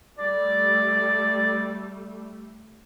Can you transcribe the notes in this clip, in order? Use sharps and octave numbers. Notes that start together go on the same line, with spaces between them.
G3 A3 D5